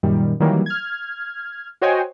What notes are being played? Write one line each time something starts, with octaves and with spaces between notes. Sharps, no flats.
F#2 A#2 D#3 G3
D#3 E3 F#3 G3 A#3
F6 G#6
F#4 C5 C#5 D#5 G5 G#5